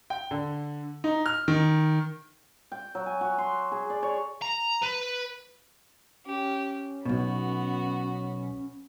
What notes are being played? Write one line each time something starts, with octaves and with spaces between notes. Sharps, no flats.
G5
D3
D#4
F6
D#3
G5
F#3
G#5
F#4
C6
G#4
D5
C#5
A#5
B4
C#4 G4
B1 G2 B2 B3 F#4